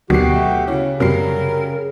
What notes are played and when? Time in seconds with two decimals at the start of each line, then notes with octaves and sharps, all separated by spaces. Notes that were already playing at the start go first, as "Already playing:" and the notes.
0.10 D2 B2 D3 D#3 F#3 F#4 G4 C7
0.35 A3
0.67 C#3 C#4 E4 F#4
1.00 F#2 C3 F#3 G3 A#4 C7